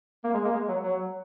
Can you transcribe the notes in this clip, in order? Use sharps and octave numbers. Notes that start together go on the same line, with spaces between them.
A#3
G#3
A#3
G#3
F#3
F#3